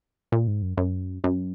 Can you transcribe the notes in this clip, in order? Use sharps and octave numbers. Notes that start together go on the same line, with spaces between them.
A#2
G#2
F#2
F#2
F#2